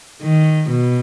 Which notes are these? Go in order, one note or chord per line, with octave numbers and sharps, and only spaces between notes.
D#3
B2